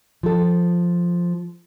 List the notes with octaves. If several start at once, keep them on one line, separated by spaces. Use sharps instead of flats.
F3 A4